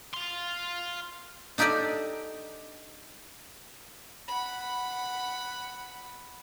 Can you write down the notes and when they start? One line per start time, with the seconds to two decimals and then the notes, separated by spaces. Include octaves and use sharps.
0.14 F5 C6
1.58 D4 D#4 G4 A4 D5 D#5
4.28 F#5 B5